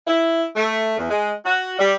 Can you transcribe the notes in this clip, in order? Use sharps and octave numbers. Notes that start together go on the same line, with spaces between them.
E4
A3
E2
G#3
F#4
G3